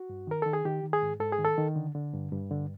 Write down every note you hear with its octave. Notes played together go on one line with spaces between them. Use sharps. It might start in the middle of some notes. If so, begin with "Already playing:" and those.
Already playing: F#4
G2
D#3 A#4
D#3 A4
G#4
D#3 G4
D#3
G#4
G#2
G#2 A4
G#4
D#3
A4
D#3
D3
D3
G2
G2
D3